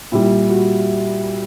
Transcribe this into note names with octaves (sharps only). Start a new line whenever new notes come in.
A#2 G3 E4
F#4